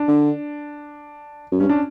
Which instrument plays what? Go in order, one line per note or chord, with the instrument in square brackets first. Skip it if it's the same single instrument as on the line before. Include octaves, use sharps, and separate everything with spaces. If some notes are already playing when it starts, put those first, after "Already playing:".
Already playing: [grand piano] D4
[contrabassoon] D3
F#2
[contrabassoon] G2 [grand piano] C#4
[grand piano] D4